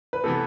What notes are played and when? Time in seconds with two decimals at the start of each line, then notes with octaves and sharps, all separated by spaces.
0.13 B4
0.24 C3 E3 B3 A4